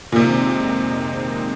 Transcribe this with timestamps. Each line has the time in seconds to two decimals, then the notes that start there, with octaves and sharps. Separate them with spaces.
0.12 A#2
0.16 F2 C3 D#3 G#3 C4 D#4